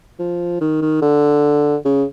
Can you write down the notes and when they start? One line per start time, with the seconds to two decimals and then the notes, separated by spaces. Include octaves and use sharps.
0.19 F3
0.61 D#3
0.82 D#3
1.02 D3
1.85 C#3